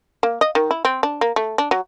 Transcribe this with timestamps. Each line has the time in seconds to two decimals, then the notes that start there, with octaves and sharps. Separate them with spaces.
0.23 A#3
0.41 D#5
0.55 D#3
0.71 E4
0.85 C4
1.03 D4
1.21 A#3
1.36 A3
1.58 D4
1.71 F#3